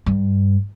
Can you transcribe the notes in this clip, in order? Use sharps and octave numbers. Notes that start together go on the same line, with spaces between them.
G2